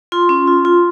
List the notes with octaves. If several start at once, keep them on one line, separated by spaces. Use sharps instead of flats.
F4 C6
C#4
F4
F4